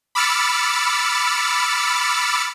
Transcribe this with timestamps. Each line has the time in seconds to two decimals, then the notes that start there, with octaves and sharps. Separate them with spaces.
0.15 B5 D6 E6 F6 A6 C#7